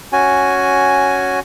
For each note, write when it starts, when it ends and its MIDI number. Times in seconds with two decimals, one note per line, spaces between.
0.12 1.40 61
0.12 1.40 66
0.12 1.40 80